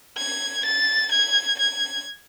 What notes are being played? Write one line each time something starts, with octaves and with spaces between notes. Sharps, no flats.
G#6
A6
G#6
G#6